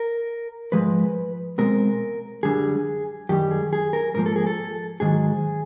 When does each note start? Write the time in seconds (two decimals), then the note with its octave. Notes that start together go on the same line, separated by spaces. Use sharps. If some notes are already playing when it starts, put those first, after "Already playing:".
Already playing: A#4
0.72 G#2 F3 G#3 B4
1.58 B2 G#3 C4 A#4
2.43 F#2 D3 G3 G#4
3.29 F#2 D#3 G3 G4
3.51 G#4
3.73 G#4
3.93 A#4
4.15 G#2 F3 A#3 A#4
4.26 A4
4.36 G#4
4.47 A4
5.00 G#2 D#3 F#3 G#4